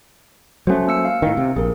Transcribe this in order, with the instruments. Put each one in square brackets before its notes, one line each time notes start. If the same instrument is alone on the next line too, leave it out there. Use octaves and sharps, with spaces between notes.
[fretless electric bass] F#3 A3 [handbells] C#4 C5
[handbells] A#3 E6 C#7
F5
[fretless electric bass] A2 D#3
C3
[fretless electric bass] A#1 [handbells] G#4 A#4